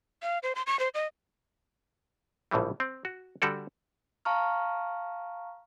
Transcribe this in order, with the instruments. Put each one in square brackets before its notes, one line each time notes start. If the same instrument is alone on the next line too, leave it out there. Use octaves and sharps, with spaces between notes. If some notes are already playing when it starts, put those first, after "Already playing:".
[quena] F5
C5
C6
C#6
C5
D#5
[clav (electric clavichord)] A#1 A2 C#3 E3 G3
C4
F#4
D3 G3 F#4 A4 D5
[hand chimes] F5 A5 A#5 C#6 F6